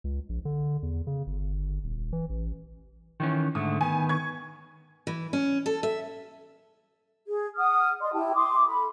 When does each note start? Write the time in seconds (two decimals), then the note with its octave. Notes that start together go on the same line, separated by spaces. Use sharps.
0.04 C#2
0.29 A#1
0.45 D3
0.83 E2
1.07 C#3
1.27 G1
1.84 D#1
2.13 E3
2.29 A1
3.20 D#3 E3 C#4
3.55 G#2 D3 A3 D#6
3.81 D#3 B3 G#5
4.09 C#6 G#6
5.07 E3
5.33 C#4
5.66 A4
5.83 E5
7.26 G#4
7.57 F#5 D#6 F6
8.01 D5 D#5 C6
8.13 E4 G4 G5 A5
8.34 C6 D6 D#6
8.66 A4 B5